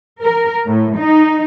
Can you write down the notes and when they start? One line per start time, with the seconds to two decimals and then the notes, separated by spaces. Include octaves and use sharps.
0.22 A#4
0.66 A2
0.96 D#4